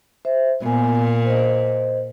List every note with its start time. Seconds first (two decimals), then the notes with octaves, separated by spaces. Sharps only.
0.25 C5 E5
0.62 A#2 B3 G#5
1.25 C5 D#5